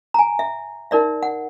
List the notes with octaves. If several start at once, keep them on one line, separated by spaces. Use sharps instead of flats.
G#5 A#5
E5
D#4 A#4 D5 E5
F#5